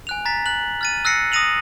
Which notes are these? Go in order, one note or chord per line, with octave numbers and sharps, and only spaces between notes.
G#5 F#6 F7
A#5 A6 B6
F#6 F#7
F6 A6 D#7
E6 F#6 A#6 C7 C#7
D#6 E6 A#6 D#7 F7 F#7